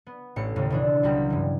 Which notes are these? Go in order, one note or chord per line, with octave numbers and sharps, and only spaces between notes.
B3
A1 A2 C#7
D#2 A2 C#3
B2 E3 D4
C#2 F#3 G3
G2 E3